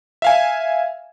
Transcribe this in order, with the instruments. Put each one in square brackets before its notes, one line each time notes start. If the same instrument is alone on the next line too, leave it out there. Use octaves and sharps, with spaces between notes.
[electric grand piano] E5 F5 G#5